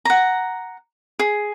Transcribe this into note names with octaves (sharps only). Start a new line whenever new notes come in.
F#5 A#5
G#4